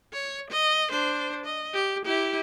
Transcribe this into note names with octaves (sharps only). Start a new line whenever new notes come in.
C#5
D#5
D4 C5
D#5
G4
E4 G4